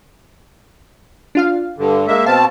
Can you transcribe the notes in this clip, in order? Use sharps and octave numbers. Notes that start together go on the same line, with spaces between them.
D4 F4 F5
G2 D3
G#3 A#3 E5
B2 C4 F5 A5